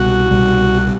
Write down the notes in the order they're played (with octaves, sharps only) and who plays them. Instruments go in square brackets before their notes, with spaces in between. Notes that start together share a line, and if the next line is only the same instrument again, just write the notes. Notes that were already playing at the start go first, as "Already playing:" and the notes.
Already playing: [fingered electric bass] C2 B2 G3 [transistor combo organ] F#4
[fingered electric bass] C2 B2 G3